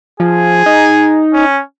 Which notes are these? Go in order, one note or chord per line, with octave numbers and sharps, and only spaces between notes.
F3 G#4
D#4
C#4